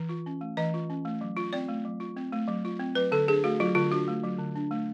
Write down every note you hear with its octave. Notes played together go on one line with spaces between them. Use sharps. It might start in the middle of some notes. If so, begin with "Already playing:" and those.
Already playing: E3
F4
C#4
A3
E3 D#5
F4
C#4
A3
F#3
F4
C4 D5
A3
F#3
F4
C4
A3
F#3
F4
C4
F#3 B4
D3 A4
D4 G#4
A3 F#4
F#3 F4
D3 F4
D4 F#4
A3
F#3
D3
D4
A3